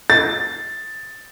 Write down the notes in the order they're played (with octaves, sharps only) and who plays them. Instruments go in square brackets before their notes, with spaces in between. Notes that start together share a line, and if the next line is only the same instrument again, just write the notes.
[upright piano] A6